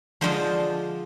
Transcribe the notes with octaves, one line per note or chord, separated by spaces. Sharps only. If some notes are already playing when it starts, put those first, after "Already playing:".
D3 F3 G#3 D4 F4 C5 D#5